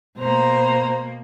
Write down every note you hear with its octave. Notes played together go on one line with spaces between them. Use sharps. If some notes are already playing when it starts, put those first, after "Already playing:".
B2 A#3 C5 A#5